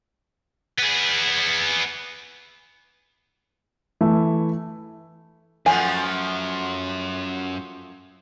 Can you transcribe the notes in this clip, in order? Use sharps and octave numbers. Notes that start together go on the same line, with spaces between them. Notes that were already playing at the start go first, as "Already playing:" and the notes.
B3 G#4
E3 A3 E4
F#2 F3 A3 B3 G#5